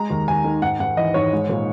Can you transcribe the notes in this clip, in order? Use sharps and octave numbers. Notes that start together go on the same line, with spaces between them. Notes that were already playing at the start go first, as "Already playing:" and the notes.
Already playing: G#3 A#5
D#2
D#2 G#5
D#3
G#2 F#5
G#2 F#5
E3 D#5
G#2 C#5
G#3
A#2